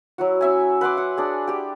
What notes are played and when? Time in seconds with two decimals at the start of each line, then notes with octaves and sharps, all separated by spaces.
0.18 F#3 E4 F#4
0.41 C#4 E5 G#5
0.81 B4 F#5 C6 D6
0.97 F#5
1.17 D4 G#4
1.48 G4 G5